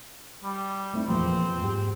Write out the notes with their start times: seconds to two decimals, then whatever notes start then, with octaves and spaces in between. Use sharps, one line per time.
0.44 G3
0.93 A3 C4 E4
1.08 E2 A#2 F3 C4
1.61 G#2 G4